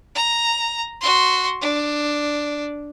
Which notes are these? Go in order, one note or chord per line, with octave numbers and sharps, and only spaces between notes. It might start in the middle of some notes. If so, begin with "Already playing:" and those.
A#5
F#4 C6
D4